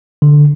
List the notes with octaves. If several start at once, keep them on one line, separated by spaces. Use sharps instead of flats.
D3